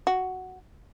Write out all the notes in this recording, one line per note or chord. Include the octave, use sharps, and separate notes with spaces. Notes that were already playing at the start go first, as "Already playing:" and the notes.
F#4